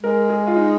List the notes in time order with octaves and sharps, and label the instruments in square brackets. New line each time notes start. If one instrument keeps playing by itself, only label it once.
[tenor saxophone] G#3 [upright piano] A#4
[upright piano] G#4
F4
D#4